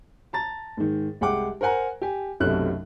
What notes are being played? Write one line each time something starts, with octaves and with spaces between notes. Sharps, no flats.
A5 A#5 A6
G#2 D#3
C2 G#3 F#5 G5 D6
A#4 C5 F#5 G#5 A#5
G4 G#5
B1 F#2 C3 A3 C#4 F#6